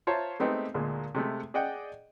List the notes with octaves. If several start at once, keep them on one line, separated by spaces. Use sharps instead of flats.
F4 C5 C#5 E5 A5 A#5
G#3 A3 B3 C4 D#4 G4
D2 A#2 G#3 A#3
C3 G#3 A3
G#4 D5 D#5 F#5 G5